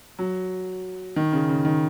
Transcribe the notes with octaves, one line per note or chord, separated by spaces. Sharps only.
F#3
D#3
C#3
C#3
D#3